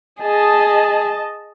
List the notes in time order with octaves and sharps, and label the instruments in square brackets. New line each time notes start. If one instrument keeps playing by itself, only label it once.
[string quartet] G#4 [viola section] D#5 A5